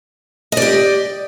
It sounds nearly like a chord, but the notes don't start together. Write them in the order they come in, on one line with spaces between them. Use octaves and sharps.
D#5 D5 G4